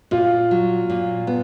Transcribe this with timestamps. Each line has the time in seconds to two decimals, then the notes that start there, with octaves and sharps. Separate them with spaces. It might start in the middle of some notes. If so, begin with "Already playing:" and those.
0.11 A#2 F4
0.51 F#3
0.90 A#2
1.27 B3